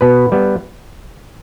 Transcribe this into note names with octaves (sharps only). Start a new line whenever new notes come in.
B2 B3 B4
G3 B3